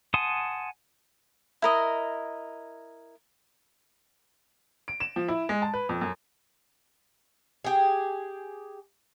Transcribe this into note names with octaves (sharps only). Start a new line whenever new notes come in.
F#5 G#5 A5 C6 D#6
E4 A#4 D#5
D7
E7
F3
E4
G#3
A5
B4
F2
F#2
G4 G#4